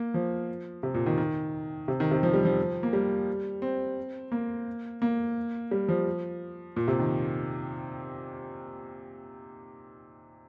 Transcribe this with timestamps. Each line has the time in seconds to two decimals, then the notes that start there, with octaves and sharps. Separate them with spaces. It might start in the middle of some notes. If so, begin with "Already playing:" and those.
Already playing: A#3
0.14 F3
0.83 C3
0.94 A#2
1.06 D#3
1.18 D#3
1.88 C3
2.00 D#3
2.11 C3
2.23 F3
2.34 G3
2.45 F3
2.83 A#3
2.93 G3
3.62 C4
4.32 A#3
5.02 A#3
5.71 G3
5.88 F3
6.76 A#2
6.88 C3
6.99 D#3